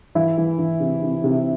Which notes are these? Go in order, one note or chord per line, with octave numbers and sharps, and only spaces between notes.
E3 E4
E3
E3
C3
C3
C3